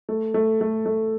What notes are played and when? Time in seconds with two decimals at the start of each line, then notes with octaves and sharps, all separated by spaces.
0.09 A3
0.34 A3
0.61 A3
0.86 A3